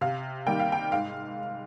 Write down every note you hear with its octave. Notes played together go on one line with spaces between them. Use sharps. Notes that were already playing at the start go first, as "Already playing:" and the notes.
C3 F5
D#3 G3 A#3 G5
F5
G5
G#2 F5